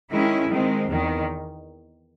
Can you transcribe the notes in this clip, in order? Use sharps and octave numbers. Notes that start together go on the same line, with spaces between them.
D#3 G#3 C#4 E4
D#3 G#3 C4
E2 D#3